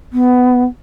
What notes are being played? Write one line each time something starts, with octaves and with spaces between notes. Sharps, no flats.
B3